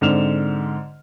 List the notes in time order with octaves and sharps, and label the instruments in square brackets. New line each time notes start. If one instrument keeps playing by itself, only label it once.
[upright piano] G#2 D3 C4 F6 E7 F7